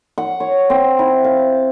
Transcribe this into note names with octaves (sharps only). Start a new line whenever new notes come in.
F#5
C#5
C4
E4
F5